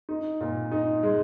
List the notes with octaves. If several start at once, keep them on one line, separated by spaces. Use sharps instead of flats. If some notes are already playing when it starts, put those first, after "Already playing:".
D#4
A#2
D#4
G#3